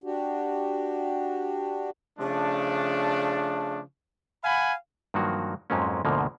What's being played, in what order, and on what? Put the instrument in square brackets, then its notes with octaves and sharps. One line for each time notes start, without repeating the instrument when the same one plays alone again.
[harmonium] D4 F#4 G4
[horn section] C#3 F3 A3 D4
F5 F#5 G#5 B5
[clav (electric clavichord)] G2 D#3 F3 F#3 A#3 F#4
F2 G#2 F3 F#3 A#3 C#4
D2 G#2 B2 D3 F3 A#3